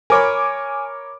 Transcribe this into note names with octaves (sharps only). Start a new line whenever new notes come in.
A#4 C#5 G#5 B5 D6